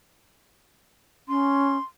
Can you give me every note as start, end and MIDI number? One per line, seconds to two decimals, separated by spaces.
1.28 1.77 61
1.28 1.83 84